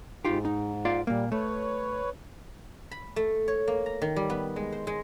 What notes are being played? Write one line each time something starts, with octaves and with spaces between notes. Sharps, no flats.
G#2 D#4 F4 G4
D#4
F4 D5 F5
A#2 G3 A#3
A3 B4 C#5
B5
A3
C#5
A#3
A#5
D#3
G3
B3
G#3
C5
G#3